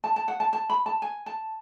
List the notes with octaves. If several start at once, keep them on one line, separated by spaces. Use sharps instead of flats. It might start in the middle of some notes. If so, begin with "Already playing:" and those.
A5
A5
F#5
A5
A5
B5
A5
G#5
A5